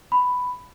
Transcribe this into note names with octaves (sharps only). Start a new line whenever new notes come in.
B5